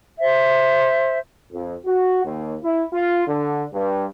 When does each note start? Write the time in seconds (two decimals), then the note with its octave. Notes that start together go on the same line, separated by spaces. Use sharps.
0.19 C5 E5
1.52 F2
1.86 F#4
2.24 D#2
2.63 E4
2.93 F4
3.27 D3
3.73 G2